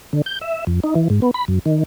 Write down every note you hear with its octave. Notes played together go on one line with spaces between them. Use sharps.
D3
G6
E5
F2
D#4
E3
G#2
B3
B5
F#2
D#3